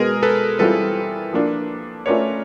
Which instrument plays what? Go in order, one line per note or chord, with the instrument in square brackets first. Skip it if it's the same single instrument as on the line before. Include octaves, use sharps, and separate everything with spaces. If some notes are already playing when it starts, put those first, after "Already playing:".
Already playing: [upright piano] B2 G#3 B3 [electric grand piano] G#4 A#4
[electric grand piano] A4 B4
[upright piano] E3 G3 C4 F4 [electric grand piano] A4 B4
[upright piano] F3 A#3 D4
[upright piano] A3 C#4 F4 A#4 D5 [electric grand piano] B4 C#5